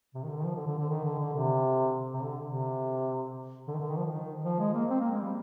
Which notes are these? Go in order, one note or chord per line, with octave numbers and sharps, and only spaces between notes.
C3
D#3
D3
D#3
F3
D3
D3
D3
D#3
D3
D3
C3
C3
D3
C3
D3
D#3
D3
D#3
F3
D#3
F3
G#3
A#3
C4
A#3
G#3
G3